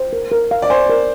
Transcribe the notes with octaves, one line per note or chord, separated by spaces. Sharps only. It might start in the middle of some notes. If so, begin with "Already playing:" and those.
Already playing: C5
A#4
A#4
F5
D5
C5 G#5
A#4